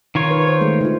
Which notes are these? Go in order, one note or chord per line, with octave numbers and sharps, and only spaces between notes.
D#3 F4 C#5
B4
C5
G#3 A3
D3 F4